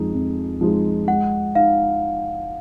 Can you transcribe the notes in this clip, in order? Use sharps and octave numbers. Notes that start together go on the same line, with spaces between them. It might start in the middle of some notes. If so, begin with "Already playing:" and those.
Already playing: F2 F3 G#3 D#4 G#4
F2
F3 G#3 D#4 G#4
G#3 F#5
D#4 F5